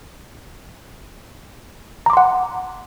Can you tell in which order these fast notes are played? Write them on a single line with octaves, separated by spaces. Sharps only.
A#5 D6 C6 F#5